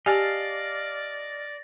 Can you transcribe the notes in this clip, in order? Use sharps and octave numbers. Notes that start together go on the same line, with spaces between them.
G4 D5 D#5 F5 G#5 A5 A6 A#6